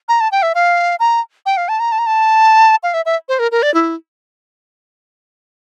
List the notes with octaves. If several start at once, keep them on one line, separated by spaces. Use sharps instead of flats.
A#5
A5
G5
E5
F5
A#5
G5
F5
A5
A#5
A5
A#5
A5
F5
E5
E5
C5
A#4
A#4
D5
E4